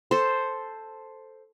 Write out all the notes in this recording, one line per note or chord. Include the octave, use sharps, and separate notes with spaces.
A4 C5